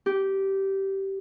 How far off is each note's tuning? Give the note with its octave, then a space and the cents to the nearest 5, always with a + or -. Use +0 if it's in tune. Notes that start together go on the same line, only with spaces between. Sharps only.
G4 -15